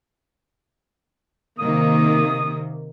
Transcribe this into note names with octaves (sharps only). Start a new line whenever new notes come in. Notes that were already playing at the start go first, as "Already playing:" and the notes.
C3 D#3 A#3 D#6